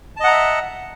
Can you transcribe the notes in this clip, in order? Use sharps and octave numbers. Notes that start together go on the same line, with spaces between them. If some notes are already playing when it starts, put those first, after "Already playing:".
D#5 E5 F#5 A5 A#5